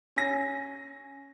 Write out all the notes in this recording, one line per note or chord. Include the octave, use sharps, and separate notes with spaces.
C#4 G#5 A#6